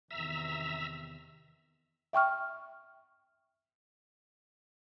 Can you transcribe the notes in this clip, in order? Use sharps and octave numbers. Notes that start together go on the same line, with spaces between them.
E2 C3 D#3 E5 A#5 E6
E5 G5 C#6 F6